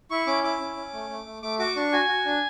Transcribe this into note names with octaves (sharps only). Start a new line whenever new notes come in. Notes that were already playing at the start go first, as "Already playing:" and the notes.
E4 C#6
C#4 D6
E4 D6
C#4
C#4
A3
A3
A3
A3 D6
F#4 D6
D4 C#6
F#4 G#5
F#4
D4